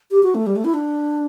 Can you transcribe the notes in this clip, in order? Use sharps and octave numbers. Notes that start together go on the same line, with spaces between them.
G4
F#4
A3
G3
A3
E4
D4